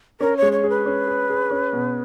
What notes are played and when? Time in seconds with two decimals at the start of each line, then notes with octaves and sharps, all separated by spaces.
0.20 C#4 A#4
0.37 C#5
0.42 G#3
0.52 C#5
0.64 G#4
0.69 B4
0.86 C#4
1.07 G#4
1.30 G#4
1.50 C#4
1.73 B2